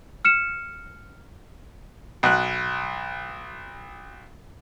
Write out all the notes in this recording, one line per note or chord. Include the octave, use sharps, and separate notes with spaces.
F6 C#7 E7
B1 F#6